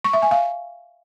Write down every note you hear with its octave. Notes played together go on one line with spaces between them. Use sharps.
C#6
E5
G#5
F5